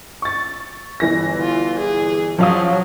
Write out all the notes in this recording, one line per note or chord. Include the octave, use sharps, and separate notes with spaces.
C#6 A6
G1 E3 A#6
F4
G#4
F3 F#3 F5 D#6